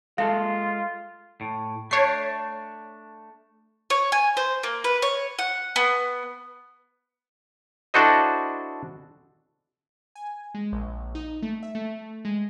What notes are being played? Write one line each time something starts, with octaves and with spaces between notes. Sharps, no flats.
G#3 F4 A4 F5
A2
A3 D4 C#5 C7
C#5
G#5
C5
A#3
B4
C#5
F#5
B3
D4 E4 F#4 A4 C5 D#5
G#5
G#3
A#1
D#4
A3
E5
A3
G#3